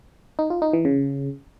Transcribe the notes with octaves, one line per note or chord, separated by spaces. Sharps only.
D#4
F4
D#4
E3
C#3